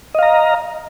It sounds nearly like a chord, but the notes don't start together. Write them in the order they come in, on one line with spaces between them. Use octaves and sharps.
D#5 F5 A#5